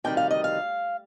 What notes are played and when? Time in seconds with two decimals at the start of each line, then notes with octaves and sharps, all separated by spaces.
0.04 D2 C3 D#3 G3 G5
0.17 F5
0.31 D#5
0.44 F5